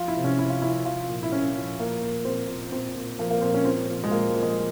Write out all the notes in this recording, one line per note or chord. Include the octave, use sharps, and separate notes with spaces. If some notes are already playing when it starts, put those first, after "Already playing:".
Already playing: F3 F4
E4
C3
C#4
C3 E4
F4
F3 E4
F3 F4
A#2
E4
A#2 C#4
F3
A#2 A#3
A#2
A#2 C4
A#2
A#2 C4
A#2
F3 A#3
A#3
A#2 C4
C#4
F3 C4
A#2
G#3
A#2 A#3
F3
G#3